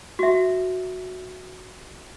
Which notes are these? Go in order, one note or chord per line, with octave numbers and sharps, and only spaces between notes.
F#4 E5